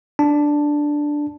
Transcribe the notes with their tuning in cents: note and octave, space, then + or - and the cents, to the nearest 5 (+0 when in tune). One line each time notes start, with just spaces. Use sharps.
D4 +0 A5 +0